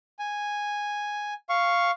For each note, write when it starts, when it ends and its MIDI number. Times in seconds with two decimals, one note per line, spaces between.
0.19 1.34 80
1.49 1.91 77
1.49 1.91 85